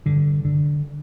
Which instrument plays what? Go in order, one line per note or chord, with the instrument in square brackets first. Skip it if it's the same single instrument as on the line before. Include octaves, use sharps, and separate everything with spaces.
[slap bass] G2 D3
D3